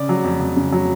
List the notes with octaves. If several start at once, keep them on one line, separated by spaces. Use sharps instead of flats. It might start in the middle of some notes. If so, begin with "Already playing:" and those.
Already playing: C#3 D5
F#3
F2
F2
C#3
F#3